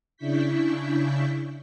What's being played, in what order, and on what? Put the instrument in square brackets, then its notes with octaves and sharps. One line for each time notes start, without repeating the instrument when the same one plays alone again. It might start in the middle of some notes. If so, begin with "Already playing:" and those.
[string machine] C#3 D4 E4 C#6 G6 B6